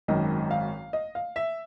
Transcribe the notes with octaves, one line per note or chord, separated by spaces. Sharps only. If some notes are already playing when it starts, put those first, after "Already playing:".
G#1 F#2 D#3 D#5
F5
D#5
F5
E5